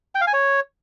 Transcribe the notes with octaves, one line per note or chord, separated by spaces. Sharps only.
G5
F5
G#5
C#5